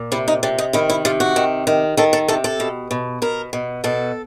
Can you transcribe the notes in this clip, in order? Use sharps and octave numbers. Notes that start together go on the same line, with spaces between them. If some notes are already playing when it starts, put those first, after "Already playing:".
Already playing: A#2
C3 E4
D#4
C3 D4
D#4
D#3 E4
E4
C3 F4
F#4
D#3
D#3
D#3 A4
A4
C3 A4
A4
B2
B2
B2 A#4
B2
B2 A4